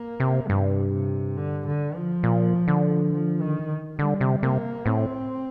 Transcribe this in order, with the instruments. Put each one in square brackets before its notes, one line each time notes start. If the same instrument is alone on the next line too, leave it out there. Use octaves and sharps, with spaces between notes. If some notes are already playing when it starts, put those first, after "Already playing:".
Already playing: [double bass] A#3
[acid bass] C3
[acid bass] G2 [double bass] C3
[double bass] C3
D3
D3
F3
[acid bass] A#2
D3
[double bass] F3
D#3
[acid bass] D3 [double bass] G3
[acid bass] C3
[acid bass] C3 [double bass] A#3
[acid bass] A2 [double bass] C4